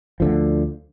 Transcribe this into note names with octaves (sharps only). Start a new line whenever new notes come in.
D2 D3 F3